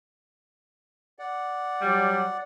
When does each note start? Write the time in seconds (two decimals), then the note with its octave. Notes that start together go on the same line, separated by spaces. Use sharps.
1.19 D5 F#5
1.82 F#3 G3